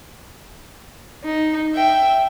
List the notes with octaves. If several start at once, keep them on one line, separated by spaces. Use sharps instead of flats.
D#4
E5 G5